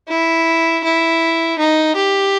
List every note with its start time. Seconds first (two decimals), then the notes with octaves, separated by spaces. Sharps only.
0.09 E4
0.84 E4
1.59 D#4
1.96 G4